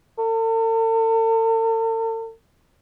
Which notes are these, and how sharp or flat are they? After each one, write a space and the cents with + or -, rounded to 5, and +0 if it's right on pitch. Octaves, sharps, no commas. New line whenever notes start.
A4 +45